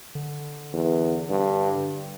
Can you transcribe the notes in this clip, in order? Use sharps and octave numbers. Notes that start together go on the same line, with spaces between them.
D3
E2
G2